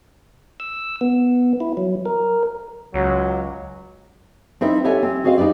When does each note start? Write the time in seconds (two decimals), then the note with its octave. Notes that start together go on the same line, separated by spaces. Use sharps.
0.60 E6
1.01 B3
1.60 E4
1.77 F#3
2.06 A#4
2.94 C#2 F#3
4.61 C4 D#4 E4 B4 C5 E5
4.84 G4 A4 C#5 E5 F#5 G#5
5.03 C4
5.24 F#4 G#4 C5 D#5 F5
5.38 D#4 G4 B4 D5